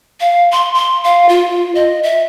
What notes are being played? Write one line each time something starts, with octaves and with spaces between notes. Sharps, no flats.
F5
C6
C6
F5
F4
D#5
E5